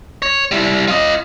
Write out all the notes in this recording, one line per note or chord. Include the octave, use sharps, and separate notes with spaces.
C#5
G3 E4
F4 D#5